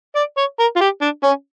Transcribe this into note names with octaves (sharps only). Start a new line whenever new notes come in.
D5
C#5
A#4
F4
G4
D4
C#4